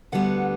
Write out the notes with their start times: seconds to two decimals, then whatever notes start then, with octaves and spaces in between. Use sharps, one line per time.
0.12 D2 D3 G3 B3 F#5